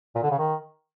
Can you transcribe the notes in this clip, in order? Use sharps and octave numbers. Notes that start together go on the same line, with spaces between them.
A#2
D3
C#3
D#3